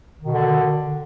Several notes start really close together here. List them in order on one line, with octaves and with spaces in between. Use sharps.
D#3 B2 D3